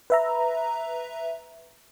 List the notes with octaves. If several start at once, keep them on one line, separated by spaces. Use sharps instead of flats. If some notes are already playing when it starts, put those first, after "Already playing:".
B4 E5 A#5